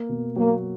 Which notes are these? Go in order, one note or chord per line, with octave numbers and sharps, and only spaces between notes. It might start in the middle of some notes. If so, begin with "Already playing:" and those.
Already playing: A#3
B2
F#3 A#3